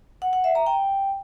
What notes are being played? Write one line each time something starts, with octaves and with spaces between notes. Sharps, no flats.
F#5
F#5
E5
A#5
G5